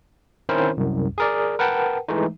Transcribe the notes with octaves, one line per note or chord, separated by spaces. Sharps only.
D#3 C4 C#4 E4 A#4 C5
C2 F#2
G#4 A#4 D5
A#4 B4 F#5 G5 A5
E3 G#3 A3 D#4